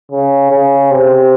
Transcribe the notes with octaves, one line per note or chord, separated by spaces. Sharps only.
C#3
C#3
C3